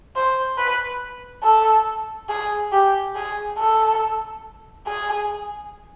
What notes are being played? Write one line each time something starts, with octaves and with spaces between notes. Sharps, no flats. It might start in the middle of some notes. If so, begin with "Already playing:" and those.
C5
B4
A4
G#4
G4
G#4
A4
G#4